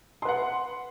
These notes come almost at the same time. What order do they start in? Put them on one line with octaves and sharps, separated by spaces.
C6 B4 F#5